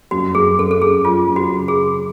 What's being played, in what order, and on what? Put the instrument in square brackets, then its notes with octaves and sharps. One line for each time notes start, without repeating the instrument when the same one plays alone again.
[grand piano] F#2 [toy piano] F#4
[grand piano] F#2 [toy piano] G#4
[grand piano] C#4 [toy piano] A4
[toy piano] A4
[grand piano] F#2 [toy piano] G#4
[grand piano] F#3 [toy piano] F4
[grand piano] F#2
[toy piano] F#4
[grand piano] C#3
[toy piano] G#4
[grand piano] C#4